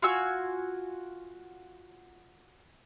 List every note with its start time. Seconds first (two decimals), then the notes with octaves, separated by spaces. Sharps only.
0.02 F4 F#4 G#5 E6